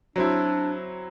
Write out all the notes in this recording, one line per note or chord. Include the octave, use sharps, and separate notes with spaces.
F#3 C4 D4 E4